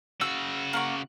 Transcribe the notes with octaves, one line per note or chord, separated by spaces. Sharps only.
C#3 F#4 E6
A#3 F#5 C#6